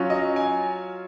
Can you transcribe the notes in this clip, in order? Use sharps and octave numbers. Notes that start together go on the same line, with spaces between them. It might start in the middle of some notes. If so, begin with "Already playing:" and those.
Already playing: F#3 C#4 F4
D#5
G#5